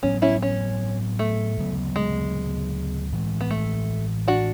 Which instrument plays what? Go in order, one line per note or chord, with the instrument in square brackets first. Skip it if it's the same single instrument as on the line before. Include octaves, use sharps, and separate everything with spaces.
[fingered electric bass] A2 F#3 B3 [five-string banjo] C#4
[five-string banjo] C#4 E4
C#4
A3
[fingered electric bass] D2 C#3 F#3 B3
[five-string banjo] G#3
[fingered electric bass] A2 E3 G#3
[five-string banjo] B3
A3
D4 F#4